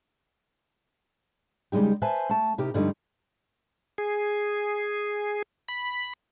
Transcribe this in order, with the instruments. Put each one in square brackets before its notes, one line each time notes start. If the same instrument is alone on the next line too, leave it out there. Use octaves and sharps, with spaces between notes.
[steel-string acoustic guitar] C#3 G3 G#3 D#4 G4
B4 C5 E5 G#5 A5
A3 A5
C3 D#4 E4 G4 A#4
G2 D3 F3 G3 A3 D#4
[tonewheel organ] G#4
B5